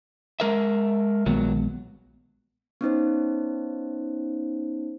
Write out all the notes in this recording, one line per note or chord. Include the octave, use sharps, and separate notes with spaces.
G#3 A#4 E5
A#1 D#3 F#3 G#3 B3
B3 C#4 D#4 C5